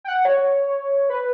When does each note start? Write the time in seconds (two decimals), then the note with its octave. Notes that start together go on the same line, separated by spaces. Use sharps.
0.04 G5
0.08 F#5
0.25 C#5
1.10 B4